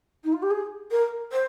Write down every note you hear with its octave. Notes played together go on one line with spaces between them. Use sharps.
D#4
F4
G4
G#4
A#4
C5